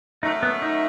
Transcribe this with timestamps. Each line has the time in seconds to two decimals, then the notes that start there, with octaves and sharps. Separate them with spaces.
0.22 F#2 D#3 F#3 A3 D#4
0.43 B3
0.62 D#4